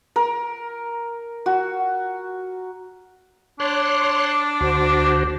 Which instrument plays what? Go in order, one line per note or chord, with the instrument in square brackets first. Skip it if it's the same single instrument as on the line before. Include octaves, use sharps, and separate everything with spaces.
[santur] A#4
F#4
[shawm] D4 [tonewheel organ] C#5 C6 F#6
[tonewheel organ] D2 F#4 C5